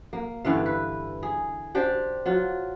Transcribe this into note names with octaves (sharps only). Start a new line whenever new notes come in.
A#3
G2 D3 E3 F5
B4
G#4
D4 G4 C5 D5
F#3 F4